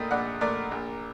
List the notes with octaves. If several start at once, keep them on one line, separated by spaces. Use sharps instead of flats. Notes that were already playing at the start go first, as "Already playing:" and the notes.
Already playing: A#1 A#2 A3 A#4 D#5 G5
A#1 D5 F#5
A#2 A3 A#4 D5
A#1